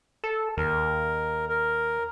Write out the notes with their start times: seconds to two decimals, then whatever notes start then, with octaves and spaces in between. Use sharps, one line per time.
0.24 A4
0.57 D#2 A#4
1.49 A#4